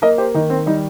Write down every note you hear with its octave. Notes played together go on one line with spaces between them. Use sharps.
A#3 A#4 D#5
G4 C5
D#3 D#4
C4
G3 D#4